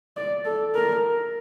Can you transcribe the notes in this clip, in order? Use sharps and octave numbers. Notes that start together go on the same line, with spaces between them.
D5
A4
A#4